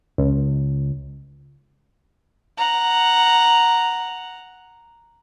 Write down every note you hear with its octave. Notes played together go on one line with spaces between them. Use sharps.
C#2
F#5 A#5